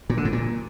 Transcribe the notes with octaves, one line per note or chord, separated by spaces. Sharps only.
A#2
D3
G#2
A#2